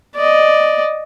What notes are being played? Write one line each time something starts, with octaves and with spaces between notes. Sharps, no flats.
D5 D#5